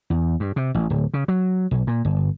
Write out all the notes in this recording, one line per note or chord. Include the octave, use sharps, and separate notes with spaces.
E2
G2
C3
A1
D1
C#3
F#3
B1
A#2
G1